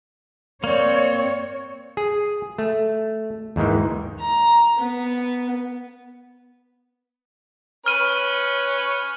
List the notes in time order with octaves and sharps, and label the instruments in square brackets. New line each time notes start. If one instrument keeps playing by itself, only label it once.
[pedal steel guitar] A#3 C4 [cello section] C#5 [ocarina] D5
[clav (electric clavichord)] G#4
A3
D#2 G#2 D#3 E3
[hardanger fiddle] A#5
B3
[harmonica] C#4 B4 [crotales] F6 D#7